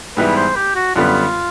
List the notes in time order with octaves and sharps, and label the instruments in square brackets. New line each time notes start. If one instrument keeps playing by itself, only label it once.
[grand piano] G#2 E3 G3 B3 E4 [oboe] B4
[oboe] C5
G4
F#4
[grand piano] F#2 D3 G3 B3 [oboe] F4